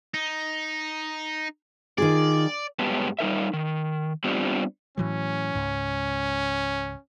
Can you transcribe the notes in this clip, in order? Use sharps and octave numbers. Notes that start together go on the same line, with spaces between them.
D#4
D#3 F4 G#4 D5
G2 F#3 G#3 B3 G4 A5
G3 D#4 A#4 E5
D#3
G3 B3 C4 D4 F4 G4
A2 E3 F#3 C#4
C#2 G#2